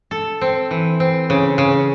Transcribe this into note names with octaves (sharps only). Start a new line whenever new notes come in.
A4
C4
E3
C4
C#3
C#3